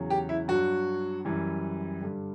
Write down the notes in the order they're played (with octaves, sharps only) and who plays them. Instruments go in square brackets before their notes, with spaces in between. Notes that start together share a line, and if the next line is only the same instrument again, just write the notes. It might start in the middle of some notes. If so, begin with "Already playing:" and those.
Already playing: [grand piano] E2 C#3 F#3
G4
E4
G2 F#3 F#4
F#2 E3 G3
G2 D3 G3